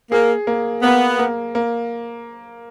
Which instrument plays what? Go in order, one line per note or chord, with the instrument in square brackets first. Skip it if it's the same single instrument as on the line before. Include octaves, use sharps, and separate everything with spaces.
[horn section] A#3 [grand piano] G#4
[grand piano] A#3
[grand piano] A#3 [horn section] B3
[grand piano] A#3
A#3